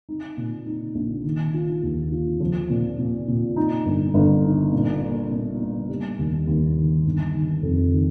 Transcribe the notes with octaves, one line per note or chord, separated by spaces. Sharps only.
D#4
A#2
D#4
A#1
D#3
F4
D#2
F4
F3
A#2
A#2
A#2
D#4
G1
G1
D#4
A#2
A#3
A#2
A#3
G3
D#2
D#2
D#3
G1
D#3
F2
D#3